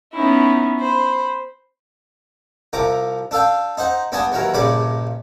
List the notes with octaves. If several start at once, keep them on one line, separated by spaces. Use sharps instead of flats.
B3 C#4 D#4 E4
C5 B5
C2 F3 A#5 D6
D4 A4 F5 G5
D#4 C5 F#5
G2 B3 D4 G#5 A5 D#6
D#2 E3 F#3 A#4
A#1 G2 C#3 D5 B5 D6